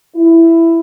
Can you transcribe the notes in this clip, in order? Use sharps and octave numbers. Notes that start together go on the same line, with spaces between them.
E4